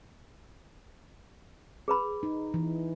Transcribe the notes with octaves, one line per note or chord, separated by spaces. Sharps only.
G#4 B4 B5
D#4
E3